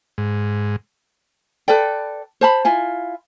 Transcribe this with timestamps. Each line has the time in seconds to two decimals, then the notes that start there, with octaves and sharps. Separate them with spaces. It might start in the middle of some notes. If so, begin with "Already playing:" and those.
0.18 G#2
1.68 A4 B4 D5 G5
2.41 C5 A5 B5
2.65 E4 F4 G#5